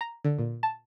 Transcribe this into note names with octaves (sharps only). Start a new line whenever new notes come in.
A#5
D3
A#2
A5